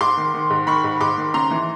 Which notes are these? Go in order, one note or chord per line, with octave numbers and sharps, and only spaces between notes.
G#2 C6 D6
D#3
D#3
G#2
D#3 B5 C#6
G#2
G#2 C6 D6
D#3
C#3 A#5 C6
E3